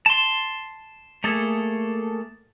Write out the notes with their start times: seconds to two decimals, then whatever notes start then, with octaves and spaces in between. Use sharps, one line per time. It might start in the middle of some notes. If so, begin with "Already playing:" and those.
0.06 A5 C6
1.24 A3 A#3 G#4 A4